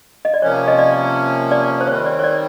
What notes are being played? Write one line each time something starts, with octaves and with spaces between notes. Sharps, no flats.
D#5
D5
C3 F3 A#3 C#4 C#5
D#5
D5
D5
C5
D#3 G3 C4 C#5
D5
C#5
D5